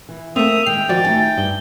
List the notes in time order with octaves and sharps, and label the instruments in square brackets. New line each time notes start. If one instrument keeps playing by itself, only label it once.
[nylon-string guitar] E3
[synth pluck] A3 C4 [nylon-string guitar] A#3 [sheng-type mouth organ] E5 D#6 [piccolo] F7
[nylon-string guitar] D#3 G#3 [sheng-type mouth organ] G5 [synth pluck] C7
[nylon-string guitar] D#3 [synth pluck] F3 F#4 D5 [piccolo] A6
[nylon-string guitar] A3 D#4 G#5
[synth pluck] G2 [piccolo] G7